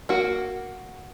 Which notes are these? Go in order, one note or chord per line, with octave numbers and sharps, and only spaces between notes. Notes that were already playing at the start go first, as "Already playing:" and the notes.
A#3 F#4